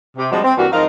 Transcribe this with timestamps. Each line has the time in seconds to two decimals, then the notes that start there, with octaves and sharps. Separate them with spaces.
0.17 C3 G4
0.32 F3 G3 G#3 C4 D4 F#4
0.44 C4
0.58 G2 E3 A#3 D4 F#4
0.72 G#2 F3 D#4 A#4 D#5 F5